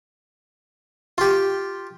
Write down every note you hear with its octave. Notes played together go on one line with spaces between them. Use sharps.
F4 G4